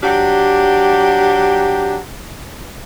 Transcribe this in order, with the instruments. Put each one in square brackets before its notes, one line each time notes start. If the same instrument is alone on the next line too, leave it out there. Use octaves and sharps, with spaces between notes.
[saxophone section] F#3 D4 G4